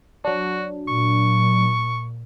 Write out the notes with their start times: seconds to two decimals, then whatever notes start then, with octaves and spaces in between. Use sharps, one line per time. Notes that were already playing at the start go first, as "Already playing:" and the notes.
0.25 F#3 D4 F#4
0.88 A#2 C#6